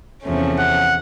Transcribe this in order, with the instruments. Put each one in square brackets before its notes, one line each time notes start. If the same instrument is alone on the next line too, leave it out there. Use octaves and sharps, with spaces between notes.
[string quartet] E2 C3 F3 A3 C#4
[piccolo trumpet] F#5